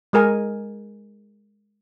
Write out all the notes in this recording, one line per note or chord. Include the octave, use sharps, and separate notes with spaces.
G#3 G#4 A#4 G#5